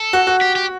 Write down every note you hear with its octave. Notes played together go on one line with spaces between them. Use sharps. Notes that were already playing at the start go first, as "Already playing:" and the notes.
Already playing: A4
F#4
F#4
G4
G4